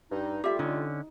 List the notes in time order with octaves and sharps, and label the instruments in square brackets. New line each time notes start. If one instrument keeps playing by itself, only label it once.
[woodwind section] G2 D#4
[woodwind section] G3 A3 F4 [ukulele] G4 E5
[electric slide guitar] D3 C#4 [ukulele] D#4